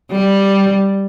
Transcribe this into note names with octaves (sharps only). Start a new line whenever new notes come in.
G3